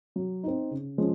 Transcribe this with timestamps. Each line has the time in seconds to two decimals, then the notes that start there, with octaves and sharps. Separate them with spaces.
0.16 F#3
0.44 C4 D#4
0.71 C#3
0.98 F3 G#3 C#4 G#4